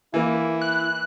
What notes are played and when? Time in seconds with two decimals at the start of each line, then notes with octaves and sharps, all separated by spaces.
0.14 E3 A#3 E4
0.61 F#6